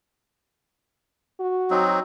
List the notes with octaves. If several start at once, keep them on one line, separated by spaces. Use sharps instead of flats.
F#4
F#3 C4 D#4